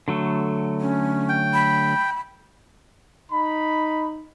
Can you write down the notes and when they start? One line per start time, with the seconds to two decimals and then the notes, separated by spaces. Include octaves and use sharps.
0.08 D3 F#3 A3
0.81 C#4
1.29 G5
1.53 B5
3.32 D#4 B5